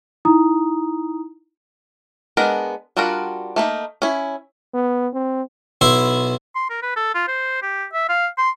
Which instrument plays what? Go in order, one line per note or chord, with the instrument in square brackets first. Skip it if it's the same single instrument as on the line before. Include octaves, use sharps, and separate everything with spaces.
[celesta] D#4 E4 A#5 D#6
[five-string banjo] G#3 B3 D4 A#4
G3 D4 F4 F#4 A#4
A3 A#3 D#4
C#4 E4
[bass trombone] B3
C4
[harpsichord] B1 E4 E5 C6
[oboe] C6
A#4
B4
A4
F4
C5
G4
E5
F5
C6